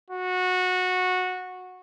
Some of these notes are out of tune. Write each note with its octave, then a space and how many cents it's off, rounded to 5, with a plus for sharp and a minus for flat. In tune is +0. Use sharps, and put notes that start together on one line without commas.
F#4 -15